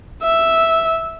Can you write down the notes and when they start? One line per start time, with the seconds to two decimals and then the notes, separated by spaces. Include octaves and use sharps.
0.23 E5